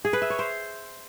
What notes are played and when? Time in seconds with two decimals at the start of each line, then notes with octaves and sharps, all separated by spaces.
0.05 G#4
0.13 B4
0.22 E5
0.30 C#5
0.39 C5